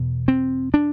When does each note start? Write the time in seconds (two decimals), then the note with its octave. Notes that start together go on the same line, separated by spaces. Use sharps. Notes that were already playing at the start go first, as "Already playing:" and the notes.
Already playing: E2 B2
0.28 C4
0.74 D4